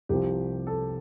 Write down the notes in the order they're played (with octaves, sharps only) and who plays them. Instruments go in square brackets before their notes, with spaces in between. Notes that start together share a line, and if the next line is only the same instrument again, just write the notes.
[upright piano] C2 C3 F3 G4
A4